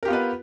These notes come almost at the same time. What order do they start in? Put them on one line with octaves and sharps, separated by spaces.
A#4 G4 F4 B3 B4